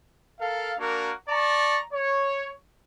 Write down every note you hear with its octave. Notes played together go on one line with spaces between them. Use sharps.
A4 A#4 F5
A#3 D4 F#4 A#4
D5 A5 A#5 C#6
C#5